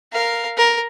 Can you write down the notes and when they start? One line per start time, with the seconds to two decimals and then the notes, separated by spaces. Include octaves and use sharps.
0.13 A#4 F5
0.57 A#4